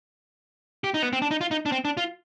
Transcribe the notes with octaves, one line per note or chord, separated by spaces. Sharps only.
G4
D#4
B3
C4
D4
D#4
F4
D#4
D4
C4
D4
F4